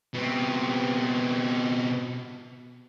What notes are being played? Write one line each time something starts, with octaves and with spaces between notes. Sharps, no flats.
B2 C4